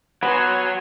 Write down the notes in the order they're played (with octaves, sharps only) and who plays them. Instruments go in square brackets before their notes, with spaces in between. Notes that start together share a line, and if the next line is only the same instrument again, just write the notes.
[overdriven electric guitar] F#3 [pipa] B3 [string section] C#5 G#5 C6